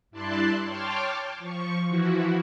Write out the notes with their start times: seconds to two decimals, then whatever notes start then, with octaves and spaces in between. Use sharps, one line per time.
0.11 G2 E4 D5 A5 C6 F#6
0.65 C#5 G5 A5 C6 D6 F6
1.38 F3 C#6
1.88 E3 F3 E4 F#4